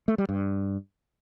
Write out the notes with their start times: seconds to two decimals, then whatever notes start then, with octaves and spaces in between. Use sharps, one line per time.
0.08 A3
0.18 G3
0.29 G2